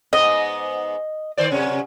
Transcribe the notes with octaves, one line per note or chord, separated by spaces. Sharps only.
G#2 B3 D#5
D#3 C5 D5
F#2 C3 C#4